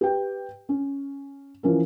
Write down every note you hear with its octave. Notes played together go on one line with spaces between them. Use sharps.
G4 B4 G5
C#4
E3 F3 C#4 A#4